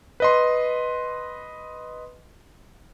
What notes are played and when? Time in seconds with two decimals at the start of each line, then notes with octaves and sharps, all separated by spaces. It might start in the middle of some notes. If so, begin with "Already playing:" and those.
0.20 B4 D#5 C6